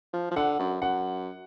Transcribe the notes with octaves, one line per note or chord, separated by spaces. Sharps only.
F3
F3
D3 F#5
F#2
F#2 F#5